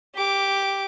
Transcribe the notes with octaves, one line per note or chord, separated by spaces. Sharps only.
G4 D6